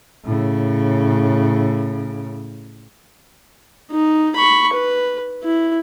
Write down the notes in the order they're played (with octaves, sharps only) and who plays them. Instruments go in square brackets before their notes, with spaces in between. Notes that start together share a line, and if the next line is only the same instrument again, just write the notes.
[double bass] A2 C#3
[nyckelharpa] D#4
B5 C#6
B4
E4